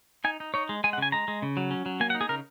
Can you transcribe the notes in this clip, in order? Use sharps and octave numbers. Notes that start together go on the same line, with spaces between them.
D#4 G#5
D#4
D#4 C#5
G#3
G#3 G#5
F#5
C#3 G#5
G#3 A#5
G#3
C#3
F#3
C#4
F#3
A#3 G#5
F#5
D#4
G#4
C#3 A#4